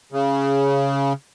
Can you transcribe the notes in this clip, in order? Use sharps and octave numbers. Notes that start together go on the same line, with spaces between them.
C#3